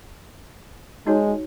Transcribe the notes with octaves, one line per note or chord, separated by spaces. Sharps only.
G#3 D#4 F#4 C#5